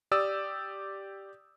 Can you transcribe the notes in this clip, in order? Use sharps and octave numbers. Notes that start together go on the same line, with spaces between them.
G4 D5 D#6 E6